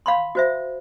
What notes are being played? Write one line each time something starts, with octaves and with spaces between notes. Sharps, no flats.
F5 B5 C6
F#4 C5 E5